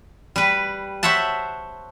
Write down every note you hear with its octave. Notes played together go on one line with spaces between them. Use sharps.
G3 B4
C5 C#5 E5 F#5 A5